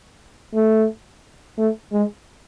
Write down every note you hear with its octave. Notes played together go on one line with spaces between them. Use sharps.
A3
A3
G#3